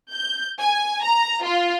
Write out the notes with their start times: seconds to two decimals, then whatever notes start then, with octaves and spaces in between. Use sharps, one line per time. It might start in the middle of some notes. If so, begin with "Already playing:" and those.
0.12 G6
0.59 G#5
1.04 A#5
1.44 F4